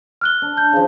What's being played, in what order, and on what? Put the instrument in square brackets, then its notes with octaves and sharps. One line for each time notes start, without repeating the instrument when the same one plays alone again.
[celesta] F6 F#6 G7
[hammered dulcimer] D4
[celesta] G6
[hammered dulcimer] C#3 F3